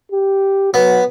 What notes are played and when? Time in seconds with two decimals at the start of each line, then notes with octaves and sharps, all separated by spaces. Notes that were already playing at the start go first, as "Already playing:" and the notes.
0.12 G4
0.74 F#3 B3